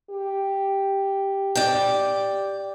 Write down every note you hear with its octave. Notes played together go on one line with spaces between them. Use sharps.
G4
D5 G5